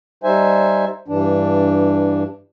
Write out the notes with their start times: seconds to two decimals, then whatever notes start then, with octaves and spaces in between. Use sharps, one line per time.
0.24 G3 D#4 C5 E5 G#5
1.08 G2 E3 D4